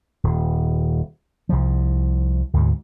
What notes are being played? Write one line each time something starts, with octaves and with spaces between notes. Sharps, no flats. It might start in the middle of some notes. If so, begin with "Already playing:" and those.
D#1
C2 F3
D2 G#2